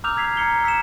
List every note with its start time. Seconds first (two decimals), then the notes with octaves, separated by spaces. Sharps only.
0.04 A#5 D6 E6 F6 G6 F7
0.16 E6 G#6 B6 C7 F7
0.37 A#5 C7 C#7 G7
0.64 E6 B6 C#7 E7